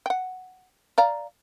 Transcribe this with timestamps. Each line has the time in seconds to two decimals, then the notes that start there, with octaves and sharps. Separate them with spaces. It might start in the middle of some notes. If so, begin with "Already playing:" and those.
0.06 F#5 G5
0.98 D5 F5 A#5